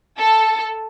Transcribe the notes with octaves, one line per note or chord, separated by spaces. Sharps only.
A4